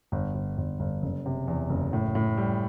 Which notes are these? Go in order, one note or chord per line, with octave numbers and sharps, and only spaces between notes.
G1
G1
G1
G1
F#1
C3
E2
F#1
A2
A2
G3